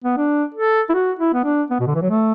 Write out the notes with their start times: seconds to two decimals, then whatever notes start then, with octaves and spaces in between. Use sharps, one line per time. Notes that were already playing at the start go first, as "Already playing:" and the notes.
0.04 B3
0.17 D4
0.54 A4
0.89 E4
0.94 F#4
1.19 E4
1.34 B3
1.45 D4
1.70 B3
1.80 B2
1.87 D3
1.95 E3
2.02 F#3
2.10 A3